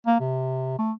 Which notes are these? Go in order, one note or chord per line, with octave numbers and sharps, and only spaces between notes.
A#3
C3
A3